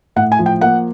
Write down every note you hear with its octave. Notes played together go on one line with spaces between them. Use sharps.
A2 F#5
G#5
F3
G5
A#3 F#5